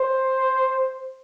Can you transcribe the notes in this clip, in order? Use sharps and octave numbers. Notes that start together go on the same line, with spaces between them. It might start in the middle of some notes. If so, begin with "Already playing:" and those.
Already playing: C5